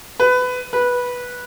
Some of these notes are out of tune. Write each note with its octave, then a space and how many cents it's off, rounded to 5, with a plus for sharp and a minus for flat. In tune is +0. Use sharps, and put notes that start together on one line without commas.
B4 +20
B4 -10